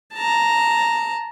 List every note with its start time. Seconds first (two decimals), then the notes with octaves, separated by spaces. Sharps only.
0.14 A5 A#5